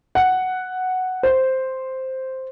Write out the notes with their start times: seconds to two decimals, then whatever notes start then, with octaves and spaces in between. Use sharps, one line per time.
0.15 F#5
1.23 C5